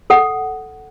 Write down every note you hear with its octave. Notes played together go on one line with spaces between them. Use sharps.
A4 F#5